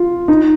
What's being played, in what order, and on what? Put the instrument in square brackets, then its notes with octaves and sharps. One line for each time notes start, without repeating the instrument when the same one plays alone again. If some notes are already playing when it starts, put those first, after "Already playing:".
Already playing: [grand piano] F4
D#4